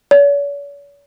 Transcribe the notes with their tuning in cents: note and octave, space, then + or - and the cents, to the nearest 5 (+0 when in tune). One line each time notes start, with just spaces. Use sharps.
C#5 +45